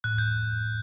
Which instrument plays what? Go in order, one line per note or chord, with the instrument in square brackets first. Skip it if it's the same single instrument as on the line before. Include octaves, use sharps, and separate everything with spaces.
[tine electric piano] A2 [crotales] F#6
[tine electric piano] A2 [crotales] G6